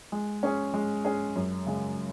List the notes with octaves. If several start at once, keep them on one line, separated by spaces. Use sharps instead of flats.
G#3
C#4 G#4
G#3
C#4 G#4
F#2
C#3 G#3